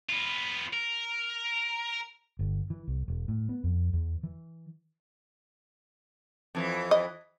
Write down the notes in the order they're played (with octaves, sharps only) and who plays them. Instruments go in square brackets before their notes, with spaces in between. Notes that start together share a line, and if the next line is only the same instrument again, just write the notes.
[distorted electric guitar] B3 F4
A#4
[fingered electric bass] G1
E3
C2
E1
A2
B3
F2
E2
E3
[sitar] F2 E3
[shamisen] D#5